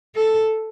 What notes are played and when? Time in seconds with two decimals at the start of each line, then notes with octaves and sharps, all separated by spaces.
0.15 A4